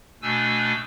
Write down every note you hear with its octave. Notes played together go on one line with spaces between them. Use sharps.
B2 A3 D4 G#5 E6